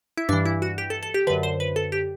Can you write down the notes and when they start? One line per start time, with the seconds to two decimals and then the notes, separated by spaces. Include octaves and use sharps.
0.18 E4
0.29 G2 E3 D4
0.45 E4
0.62 F#4
0.78 G4
0.90 A4
1.03 A4
1.14 G4
1.27 D3 B4
1.30 F#2
1.43 C5
1.60 B4
1.76 A4
1.92 G4